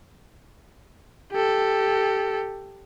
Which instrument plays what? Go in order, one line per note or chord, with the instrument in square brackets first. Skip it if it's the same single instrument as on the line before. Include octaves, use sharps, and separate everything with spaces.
[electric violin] G4 A4